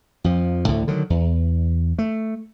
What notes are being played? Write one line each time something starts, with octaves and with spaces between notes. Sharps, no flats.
F2 F3
D2 A2 D3
D3 D#3 F#3
E2
A3